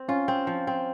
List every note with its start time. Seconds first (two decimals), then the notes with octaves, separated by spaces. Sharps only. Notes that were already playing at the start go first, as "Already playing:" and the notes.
Already playing: C4
0.09 C#4 F4
0.28 C4
0.47 F3
0.67 C4